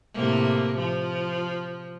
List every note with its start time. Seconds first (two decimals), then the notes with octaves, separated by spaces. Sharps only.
0.14 A2 C3 A#3
0.77 F3